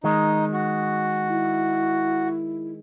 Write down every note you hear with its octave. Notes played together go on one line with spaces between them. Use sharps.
D#3 G#3 D#4
F#4
E4